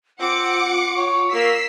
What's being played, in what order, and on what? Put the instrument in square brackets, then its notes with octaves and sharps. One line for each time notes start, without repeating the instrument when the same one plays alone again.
[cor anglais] C4 [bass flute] F4 [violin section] F#5 D6 C#7
[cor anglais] C#5
[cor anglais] A#3 [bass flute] A#4 [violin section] E6 B6 C7